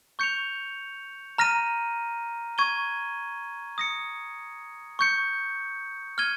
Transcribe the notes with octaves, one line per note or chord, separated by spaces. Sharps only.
C#6 G6 C#7 F7
A#5 F6 A#6 D#7
C#6 G#6 D#7 G7
D#6 A#6 C#7
C#6 G6 C#7
F6 G#6 D#7 G7